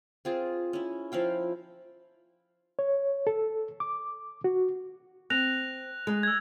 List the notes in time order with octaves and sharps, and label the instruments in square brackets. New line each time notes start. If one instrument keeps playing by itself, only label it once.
[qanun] C4 F4 G#4
C#4 E4
F3 E4 F5 G5
[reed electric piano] C#5
A4
D6
F#4
[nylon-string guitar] C4 [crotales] F#6 A#6 F7
[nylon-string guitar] G#3
[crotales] E6 G#6